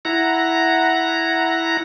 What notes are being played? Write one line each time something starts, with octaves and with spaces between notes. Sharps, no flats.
E4 F#5 A#5